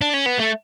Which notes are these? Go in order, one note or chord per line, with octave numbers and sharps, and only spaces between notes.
D4
C#4
B3
A3